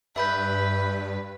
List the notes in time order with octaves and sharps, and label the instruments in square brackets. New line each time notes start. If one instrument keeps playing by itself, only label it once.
[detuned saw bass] G2 [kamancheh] B4 [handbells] E5 B5 G6